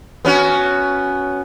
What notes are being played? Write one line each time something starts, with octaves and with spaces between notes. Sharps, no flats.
B3 C#4 F#4